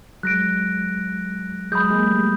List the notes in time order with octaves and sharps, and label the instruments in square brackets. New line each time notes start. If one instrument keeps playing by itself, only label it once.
[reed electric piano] F#3 G#3 [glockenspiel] F#6 A#6 D7
[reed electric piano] F#3 G#3 [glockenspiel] B5 D#6 G6
[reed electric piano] G#3 A#3
G3 A3